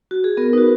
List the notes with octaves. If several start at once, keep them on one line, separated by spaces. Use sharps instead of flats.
F#4
G#4
B3 A#4
D#4 F#4 B4